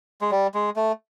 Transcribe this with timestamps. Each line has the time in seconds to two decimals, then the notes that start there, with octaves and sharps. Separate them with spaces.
0.21 G#3
0.31 G3
0.54 G#3
0.76 A3